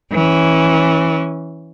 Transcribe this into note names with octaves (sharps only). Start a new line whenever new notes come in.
E3 C#4